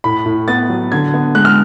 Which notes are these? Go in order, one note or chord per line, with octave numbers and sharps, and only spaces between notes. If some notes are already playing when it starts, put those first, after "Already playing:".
A2 B5
A2
B3 A6
F#3
D3 G#6
B3
G#3 F#6
F6